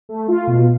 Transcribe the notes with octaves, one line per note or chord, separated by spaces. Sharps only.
A3
F4
B2